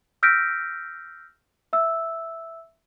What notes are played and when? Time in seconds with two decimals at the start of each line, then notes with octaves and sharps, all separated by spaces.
0.23 E6 F6 G6 A#6 B6 D7
1.73 E5 E6